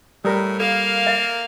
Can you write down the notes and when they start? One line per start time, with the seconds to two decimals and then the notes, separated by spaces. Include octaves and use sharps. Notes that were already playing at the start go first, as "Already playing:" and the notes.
0.25 A2 G3 A#4 B5 D#6
0.60 A#3 A4 F5
1.07 E5